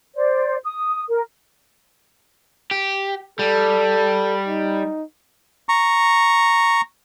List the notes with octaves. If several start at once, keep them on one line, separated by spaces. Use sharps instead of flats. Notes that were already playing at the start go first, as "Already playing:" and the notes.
C5 D5
D#6
A#4
G4
G3 A4
D#4
A#5 C#6